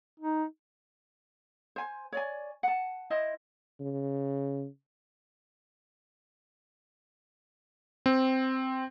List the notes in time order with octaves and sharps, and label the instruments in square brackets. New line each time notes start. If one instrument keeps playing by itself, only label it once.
[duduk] D#4
[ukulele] C5 G#5
C#5 D5 G#5
F#5 A5
E4 C5 D#5
[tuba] C#3
[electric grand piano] C4